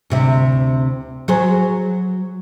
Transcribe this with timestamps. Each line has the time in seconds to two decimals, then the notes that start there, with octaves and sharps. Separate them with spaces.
0.10 D2 C3 E4
1.28 F#3 G#4 C5